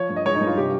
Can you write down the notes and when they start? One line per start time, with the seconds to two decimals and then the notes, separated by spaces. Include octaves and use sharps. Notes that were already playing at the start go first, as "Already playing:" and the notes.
Already playing: F3 C#5
0.09 G2
0.16 D#5
0.25 G#3 C#5
0.36 D#4
0.41 G2
0.47 F4
0.57 C3 G4